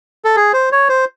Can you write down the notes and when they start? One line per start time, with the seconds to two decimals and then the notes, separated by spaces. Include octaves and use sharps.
0.25 A4
0.36 G#4
0.53 C5
0.72 C#5
0.89 C5